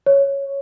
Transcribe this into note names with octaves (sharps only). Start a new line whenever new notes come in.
C#5